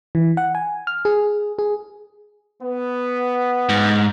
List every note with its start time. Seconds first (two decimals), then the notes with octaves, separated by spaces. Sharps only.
0.15 E3
0.37 F#5
0.55 G#5
0.87 F6
1.05 G#4
1.59 G#4
2.63 B3
3.69 G#2